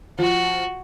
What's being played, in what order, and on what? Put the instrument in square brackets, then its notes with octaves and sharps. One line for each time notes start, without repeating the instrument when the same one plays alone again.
[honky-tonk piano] F3 [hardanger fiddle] F#4